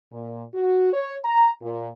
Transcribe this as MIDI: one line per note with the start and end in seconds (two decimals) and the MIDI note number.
0.13 0.44 46
0.54 0.92 66
0.93 1.17 73
1.25 1.50 82
1.62 1.89 46